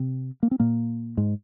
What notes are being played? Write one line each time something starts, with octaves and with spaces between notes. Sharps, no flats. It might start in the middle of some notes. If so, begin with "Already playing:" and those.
Already playing: C3 C4
A#3
C4
A#2 A#3
G#2 G#3